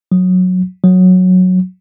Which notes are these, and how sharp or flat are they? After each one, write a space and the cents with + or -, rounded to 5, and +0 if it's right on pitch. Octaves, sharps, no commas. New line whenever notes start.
F#3 -15
F#3 -10